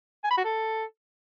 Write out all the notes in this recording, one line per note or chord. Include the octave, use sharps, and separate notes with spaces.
G#5
B5
F#4
A4